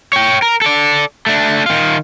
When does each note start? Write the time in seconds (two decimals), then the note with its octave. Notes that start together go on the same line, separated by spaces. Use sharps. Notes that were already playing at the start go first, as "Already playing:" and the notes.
0.13 C#5 G5
0.42 A#4
0.62 A4 D5
1.26 A3 D4
1.66 D#3 F4